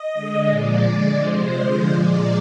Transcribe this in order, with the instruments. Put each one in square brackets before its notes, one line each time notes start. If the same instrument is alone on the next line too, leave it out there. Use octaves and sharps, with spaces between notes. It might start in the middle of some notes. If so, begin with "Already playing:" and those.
Already playing: [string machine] D#5
D3 G#3
A#2 F3 G#3 D5
D3 G#3
C3 F3 G#3 C5
D3 F3 G#3 C5
A#2 F3 G#3 D5